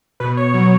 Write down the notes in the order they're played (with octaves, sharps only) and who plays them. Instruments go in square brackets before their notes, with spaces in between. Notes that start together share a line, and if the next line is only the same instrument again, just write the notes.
[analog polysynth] B2 B4
C#5
F#3